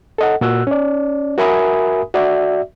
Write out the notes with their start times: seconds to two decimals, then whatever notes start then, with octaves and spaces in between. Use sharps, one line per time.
0.18 A4 D#5 F#5
0.41 A#2 F#4 E6 F#6
0.67 C#4 D5
1.38 F#4 A#4 E5 G#5 B5 D#6
2.14 F#4 D5 E5